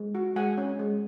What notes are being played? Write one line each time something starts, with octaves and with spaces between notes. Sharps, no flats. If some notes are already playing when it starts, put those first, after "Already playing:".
Already playing: G#3
F#4
G#3 F#5 G#5
C#4
G#3